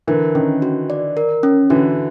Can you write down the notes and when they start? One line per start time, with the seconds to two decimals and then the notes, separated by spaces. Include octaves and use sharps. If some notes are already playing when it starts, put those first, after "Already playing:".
0.08 D3 E3 A#4
0.35 D#3 C#4
0.62 F#4
0.90 D5
1.17 A#4
1.43 C#4
1.70 D3 E3 F#4